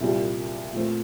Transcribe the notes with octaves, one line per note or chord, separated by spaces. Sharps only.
C2 A#2 G3
A#2 A3 C4